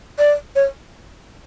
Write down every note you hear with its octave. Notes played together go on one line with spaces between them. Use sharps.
D5
C#5